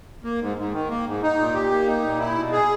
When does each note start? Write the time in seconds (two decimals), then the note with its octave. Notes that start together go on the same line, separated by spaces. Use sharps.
0.24 A#3
0.41 G#2
0.57 G#2
0.73 D#3
0.89 A#3
1.06 G#2
1.22 D#4
1.38 A#2
1.54 G4
1.71 A#3
1.87 D#4
2.03 A#2
2.19 E4
2.36 B2
2.52 G#4